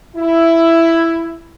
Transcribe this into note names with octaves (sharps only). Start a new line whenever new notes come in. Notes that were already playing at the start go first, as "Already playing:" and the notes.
E4